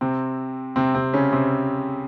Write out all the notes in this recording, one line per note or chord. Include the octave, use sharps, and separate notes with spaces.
C3 C4
C3 C4
C3 C4
C#3 C#4
C3 C4